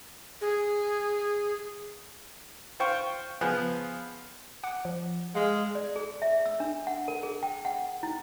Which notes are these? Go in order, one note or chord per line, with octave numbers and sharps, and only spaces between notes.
G#4
F4 C5 G5 C#6
F3 B3 G#4 F#6
F#5 D6
F3
G#3 F5 F6
D5
G#4
E5
E6
D4
F#5
A#4
G#4
G5
F#5
E4